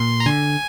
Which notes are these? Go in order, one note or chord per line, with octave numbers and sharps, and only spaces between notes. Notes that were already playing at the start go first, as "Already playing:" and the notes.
Already playing: A#2 C6
A#5
D3 G#5